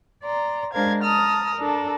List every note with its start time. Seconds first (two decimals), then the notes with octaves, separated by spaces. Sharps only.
0.24 D5 A#5 C6
0.73 G#3 D4 A#4 C5 F5 G#6
1.03 A5 A#5 D#6 F6
1.56 D4 A4 A#4